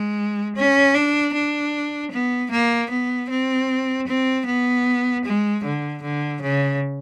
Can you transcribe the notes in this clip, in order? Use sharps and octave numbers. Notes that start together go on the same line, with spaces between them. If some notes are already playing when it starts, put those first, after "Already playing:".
Already playing: G#3
C#4
D4
D4
B3
A#3
B3
C4
C4
B3
G#3
D3
D3
C#3